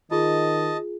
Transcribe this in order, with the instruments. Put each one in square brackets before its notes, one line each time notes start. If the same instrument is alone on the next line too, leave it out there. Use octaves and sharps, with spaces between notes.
[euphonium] D#3 [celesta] F4 G#4 [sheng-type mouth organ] D#5 A5